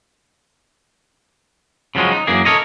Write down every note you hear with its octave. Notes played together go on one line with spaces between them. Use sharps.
C#3 F3 F#3 G#3 C#4
D#4
F#2 E3 A#3 G#4
A4 A#4 C#5 D#5